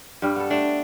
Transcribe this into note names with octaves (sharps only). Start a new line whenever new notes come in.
G2 G3
B3 A4
A3 D4